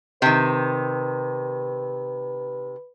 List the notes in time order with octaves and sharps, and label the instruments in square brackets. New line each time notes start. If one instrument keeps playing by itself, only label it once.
[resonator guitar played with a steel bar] C3 D#3 [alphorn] B4